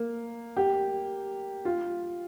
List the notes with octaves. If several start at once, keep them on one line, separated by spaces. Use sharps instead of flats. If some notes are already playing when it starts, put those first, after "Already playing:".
Already playing: A#3
G4
F4